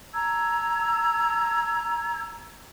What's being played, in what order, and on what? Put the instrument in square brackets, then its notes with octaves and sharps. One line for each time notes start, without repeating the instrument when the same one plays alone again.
[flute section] A5 A#5 E6 G#6